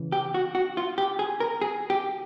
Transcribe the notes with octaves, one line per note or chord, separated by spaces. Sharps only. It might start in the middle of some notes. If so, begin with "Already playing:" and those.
Already playing: C#3 E3
G4
F#4
F#4
F4
G4
G#4
A#4
G#4
G4